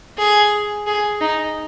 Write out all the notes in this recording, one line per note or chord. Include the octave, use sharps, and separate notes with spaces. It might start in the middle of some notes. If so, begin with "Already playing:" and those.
G#4
G#4
D#4